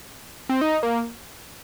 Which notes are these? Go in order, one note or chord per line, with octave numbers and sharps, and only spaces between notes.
C4
D#4
A#3